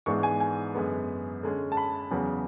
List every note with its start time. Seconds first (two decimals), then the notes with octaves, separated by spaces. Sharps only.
0.06 G#2 E3 G#3 B3 D4 C#6
0.23 G#5
0.40 G#5
0.75 F#2 D3 G#3 B3
1.43 D3 G#3 C#4
1.72 A5
1.77 B5
2.11 E2 C#3 F#3 B3